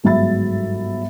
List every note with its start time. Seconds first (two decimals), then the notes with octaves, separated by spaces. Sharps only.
0.04 G1 G#2 F#3 E5 B5 A6